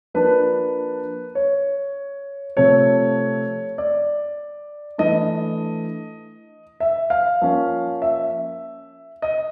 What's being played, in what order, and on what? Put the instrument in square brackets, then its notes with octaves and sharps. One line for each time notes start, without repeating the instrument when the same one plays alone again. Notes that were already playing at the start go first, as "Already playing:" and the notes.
[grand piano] F3 A#3 D4 B4
C#5
C3 F3 A3 C4 C#5
D5
E3 A3 D4 D#5
E5
F5
F3 A#3 C#4
E5
D#5